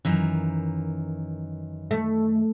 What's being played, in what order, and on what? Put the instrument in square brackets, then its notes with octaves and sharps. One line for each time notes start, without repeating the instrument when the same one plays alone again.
[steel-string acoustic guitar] F#2 D#3 E3
[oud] A3